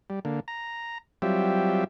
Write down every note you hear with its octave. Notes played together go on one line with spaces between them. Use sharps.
G3
D3 A#3
A#5
F#3 G3 C4 F4 G4 E5